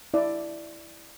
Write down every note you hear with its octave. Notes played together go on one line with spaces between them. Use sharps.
E4 D5